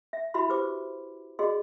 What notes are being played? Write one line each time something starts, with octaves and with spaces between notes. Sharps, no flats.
E5
E4 F#4 E5 B5 C6
G4 B4 C5 D6
F#4 G#4 D5 D#5 C6